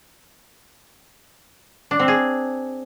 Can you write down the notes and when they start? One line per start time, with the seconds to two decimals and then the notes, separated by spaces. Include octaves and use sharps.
1.91 D4
1.99 C4
2.08 G#4